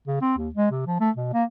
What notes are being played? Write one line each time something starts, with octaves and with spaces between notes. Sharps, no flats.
C#3
C4
D#2
G#3
C3
F3
A3
B2
A#3